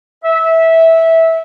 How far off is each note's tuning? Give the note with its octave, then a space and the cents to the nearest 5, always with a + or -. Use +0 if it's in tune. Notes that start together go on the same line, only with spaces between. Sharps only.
E5 -15